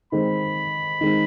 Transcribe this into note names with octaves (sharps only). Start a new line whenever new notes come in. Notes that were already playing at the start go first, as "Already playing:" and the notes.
D#3 G#3 C4 D#4 B5
D#3 G#3 C4 D#4